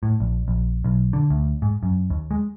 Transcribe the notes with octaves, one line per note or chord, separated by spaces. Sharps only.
A2
A#1
A#1
B1
D3
D2
G#2
F#2
D#2
G#3